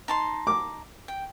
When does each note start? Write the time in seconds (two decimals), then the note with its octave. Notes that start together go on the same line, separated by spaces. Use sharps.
0.08 D#4 A5 C6
0.47 D6
1.08 G5